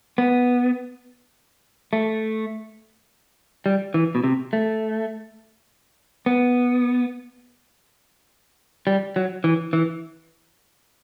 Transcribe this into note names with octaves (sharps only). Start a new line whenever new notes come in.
B3
A3
G3
E3
B2
C3
A3
B3
G3
F#3
E3
E3